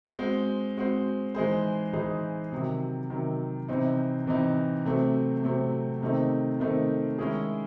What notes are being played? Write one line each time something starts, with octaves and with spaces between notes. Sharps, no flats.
G#3 C4 F#4 C5
G#3 C4 F#4 C5
E3 G#3 D#4 G#4 C5
E3 G#3 D#4 G#4 C5
C3 D#3 F#3
C3 D#3 F#3
C3 E3 C4 D#4
C3 E3 C4 D#4
C3 F#3 A3 C4
C3 F#3 A3 C4
C3 D#3 A3 C4 D#4
C3 D#3 A3 C4 D#4
D#3 G#3 C#4 E4 G#4